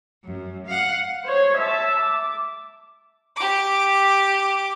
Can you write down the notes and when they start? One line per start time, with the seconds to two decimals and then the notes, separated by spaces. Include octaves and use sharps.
0.24 F#2
0.66 F5 F#5
1.25 C5 C#5
1.57 E5 A5
2.00 D6
3.36 G4 D6